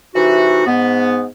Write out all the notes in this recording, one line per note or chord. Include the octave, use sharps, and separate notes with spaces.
C3 E3 A3 D#4 F#4
G#2 B3